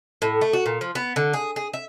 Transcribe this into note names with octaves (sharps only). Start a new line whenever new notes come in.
A2
A3
F#4
A#2
F3
B3
D3
G#4
G#4
E5